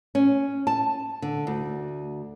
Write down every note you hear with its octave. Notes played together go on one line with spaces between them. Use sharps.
C#4
A5
D3
D2